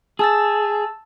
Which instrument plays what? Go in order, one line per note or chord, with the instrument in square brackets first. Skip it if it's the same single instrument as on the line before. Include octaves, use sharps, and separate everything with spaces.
[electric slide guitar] G#4 [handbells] A5 E6 A6